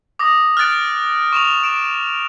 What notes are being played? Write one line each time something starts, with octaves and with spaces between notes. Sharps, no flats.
D6 D#6 A#6
F6 F#6 A6 D7
C#6 E7 F7
D7 E7